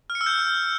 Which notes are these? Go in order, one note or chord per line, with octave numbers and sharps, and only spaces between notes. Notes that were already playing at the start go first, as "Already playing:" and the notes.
F6
C#7
E6
G6